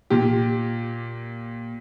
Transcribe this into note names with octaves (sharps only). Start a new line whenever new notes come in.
A#2 G4